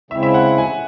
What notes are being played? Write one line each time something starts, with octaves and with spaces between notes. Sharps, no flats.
C#3 G#3 C4 E4 E5
E5
F#5
G#5